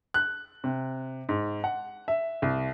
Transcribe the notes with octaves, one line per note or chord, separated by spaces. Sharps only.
F#6
C3
G#2
F#5
E5
C2